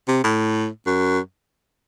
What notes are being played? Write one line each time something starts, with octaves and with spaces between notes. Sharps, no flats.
C3
A2
F#2